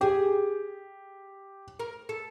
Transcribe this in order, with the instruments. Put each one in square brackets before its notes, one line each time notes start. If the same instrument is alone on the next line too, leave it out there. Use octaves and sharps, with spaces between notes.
[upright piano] G4 [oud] G#4
[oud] A#4
A4